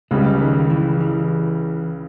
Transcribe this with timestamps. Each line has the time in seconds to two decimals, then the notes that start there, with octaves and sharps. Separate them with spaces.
0.11 C#2 C#3 G3 G#3
0.40 D#3
0.70 E3
1.00 E3